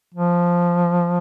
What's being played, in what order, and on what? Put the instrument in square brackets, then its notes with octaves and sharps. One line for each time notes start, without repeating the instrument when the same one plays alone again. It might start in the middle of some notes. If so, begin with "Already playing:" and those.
[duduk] F3